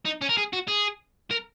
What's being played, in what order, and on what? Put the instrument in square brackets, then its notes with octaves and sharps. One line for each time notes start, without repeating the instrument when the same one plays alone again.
[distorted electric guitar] D#4
C#4
A#4
G#4
F#4
G#4
A#4